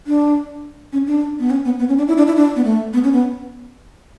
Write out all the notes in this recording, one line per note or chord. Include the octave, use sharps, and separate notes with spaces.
D4
C#4
D4
B3
C#4
B3
B3
C#4
D4
E4
D4
E4
D4
B3
A3
B3
C#4
B3